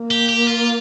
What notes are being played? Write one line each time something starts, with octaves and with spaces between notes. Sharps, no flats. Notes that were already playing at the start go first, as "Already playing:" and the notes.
Already playing: A#3
G4
G4
F4